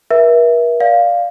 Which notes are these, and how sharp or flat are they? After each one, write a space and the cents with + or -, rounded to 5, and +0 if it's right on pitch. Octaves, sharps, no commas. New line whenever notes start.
A#4 +45 E5 +0
D5 +0 F5 +0